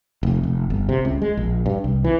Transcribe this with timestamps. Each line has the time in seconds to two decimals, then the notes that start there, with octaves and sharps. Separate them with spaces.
0.23 F1
0.43 F1
0.70 G1
0.89 C3
1.05 C#2
1.22 G#3
1.37 A#1
1.66 G2
1.84 C2
2.04 E3